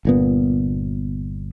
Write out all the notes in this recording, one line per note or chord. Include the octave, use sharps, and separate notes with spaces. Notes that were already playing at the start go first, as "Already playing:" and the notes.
G1 A#2 B3